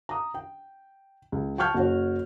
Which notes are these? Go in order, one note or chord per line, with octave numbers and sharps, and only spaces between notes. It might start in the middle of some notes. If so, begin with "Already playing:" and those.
A#5 D#6
G5
C#2
G5 A5 C#6 F6 G6 G#6
F#1 F#4 C#5